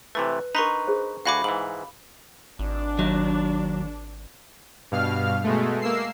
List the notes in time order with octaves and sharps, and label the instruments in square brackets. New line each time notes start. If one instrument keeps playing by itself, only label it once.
[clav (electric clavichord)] C3 E3 A3 [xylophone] B4
[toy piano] D4 A#4 [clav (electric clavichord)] D#4 B4 [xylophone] A#5 C6 C#6
[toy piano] G#4 C5
[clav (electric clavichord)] D2 F#4 G#5 [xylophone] F5 B5 D6
[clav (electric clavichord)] G#2 E3 [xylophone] F#7
[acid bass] G#1 [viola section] D4
[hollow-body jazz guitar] D#2 [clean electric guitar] F#3
[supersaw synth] G2 B2 F5 F6
B2 G#3 A3
A#3 E6 C7